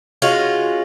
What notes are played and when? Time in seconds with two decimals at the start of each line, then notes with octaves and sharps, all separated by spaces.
0.22 G#3 C#4 F4 F#4